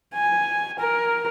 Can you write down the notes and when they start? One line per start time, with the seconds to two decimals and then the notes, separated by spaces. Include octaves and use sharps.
0.14 G#5
0.79 A#4